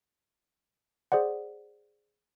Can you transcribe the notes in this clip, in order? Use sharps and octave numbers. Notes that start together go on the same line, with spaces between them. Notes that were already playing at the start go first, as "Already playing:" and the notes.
G#4 C5 D5 F#5